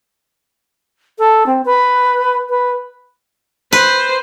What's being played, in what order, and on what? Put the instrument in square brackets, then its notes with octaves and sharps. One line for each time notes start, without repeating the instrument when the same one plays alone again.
[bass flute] A4
C4
B4
B4
[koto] B4 [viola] C5